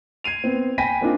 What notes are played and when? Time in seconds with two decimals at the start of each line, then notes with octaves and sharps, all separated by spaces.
0.24 G#6 C7 D#7 F7
0.44 B3 C4
0.78 G5 G#5 B5 A#6 B6 D#7
1.01 A#3 C4 D4 D#4 F4